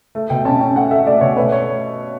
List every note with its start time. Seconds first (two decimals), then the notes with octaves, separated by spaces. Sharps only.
0.15 A3
0.30 B2 G5
0.45 C#4 A5
0.61 C#4 G5
0.76 A3 F#5
0.91 A3 E5
1.07 A3 D5
1.21 B2 C#5
1.37 A3 B4
1.52 C#5